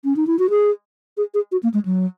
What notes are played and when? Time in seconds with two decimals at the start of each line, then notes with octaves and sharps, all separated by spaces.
0.04 C#4
0.16 D#4
0.27 E4
0.39 F#4
0.50 G#4
1.17 G#4
1.34 G#4
1.52 F#4
1.63 A#3
1.74 G#3
1.85 F#3